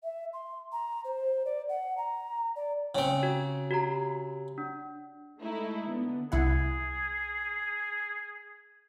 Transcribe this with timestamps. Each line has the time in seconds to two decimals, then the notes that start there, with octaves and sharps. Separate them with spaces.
0.04 E5
0.33 C6
0.72 A#5
1.05 C5
1.45 D5
1.69 F#5
1.97 A#5
2.56 D5
2.95 C#3 C4 G5
3.23 F#4
3.71 F#4 G4 A#5
4.58 D4
5.39 G#3 A3 D#4 E4
5.87 D3 B3
6.32 C2 E4 G#4 F#5